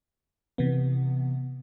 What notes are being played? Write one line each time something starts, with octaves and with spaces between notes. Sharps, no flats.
C3 E3 B3